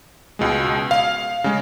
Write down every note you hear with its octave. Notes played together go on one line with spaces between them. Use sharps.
C#2 B2 G#3
F5
C#3 G#3